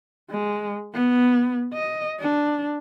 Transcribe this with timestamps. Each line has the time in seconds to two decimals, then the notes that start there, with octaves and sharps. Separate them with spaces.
0.30 G#3
0.94 B3
1.73 D#5
2.20 D4